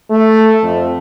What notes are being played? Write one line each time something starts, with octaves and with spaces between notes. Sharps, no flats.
A3
F2